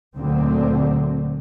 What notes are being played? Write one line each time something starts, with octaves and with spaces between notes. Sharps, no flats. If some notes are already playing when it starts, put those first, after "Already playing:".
D2 A#2 D3 F#3 C4